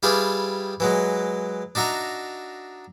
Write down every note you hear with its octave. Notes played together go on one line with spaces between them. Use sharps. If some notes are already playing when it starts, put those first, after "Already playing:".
G3 E4 F4 G4 G#4 B4
E3 F#3 G#3
D4 D#4 F#4 E5 A#5